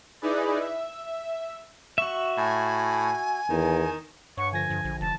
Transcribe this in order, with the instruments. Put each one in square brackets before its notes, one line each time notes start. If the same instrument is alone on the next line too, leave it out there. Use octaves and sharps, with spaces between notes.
[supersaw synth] D#4 E4 G#4 B4 D5
E5
[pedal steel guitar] F#4 E5 [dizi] C#6
[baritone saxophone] A2 [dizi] G#5
[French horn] E2 [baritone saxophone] D#3
[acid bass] G2 [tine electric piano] C#5 F#5 [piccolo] C#6
[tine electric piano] D3 F3 A#6 [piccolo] G#5
[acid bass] G2
A#1
[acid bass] F1 [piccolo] A5